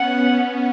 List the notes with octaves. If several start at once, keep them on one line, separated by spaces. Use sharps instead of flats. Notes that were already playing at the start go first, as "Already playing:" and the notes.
Already playing: B3 C#4 F#5